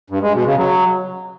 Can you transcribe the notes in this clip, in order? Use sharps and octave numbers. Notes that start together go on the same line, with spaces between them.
G2
G#3
B2
C#3
F#3